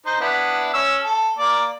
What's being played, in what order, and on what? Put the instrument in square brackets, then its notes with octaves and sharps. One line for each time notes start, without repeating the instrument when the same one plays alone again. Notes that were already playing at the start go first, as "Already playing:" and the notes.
[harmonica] D#4 C5
B3 D4 E4
C#4 E6
A4
A#3 D5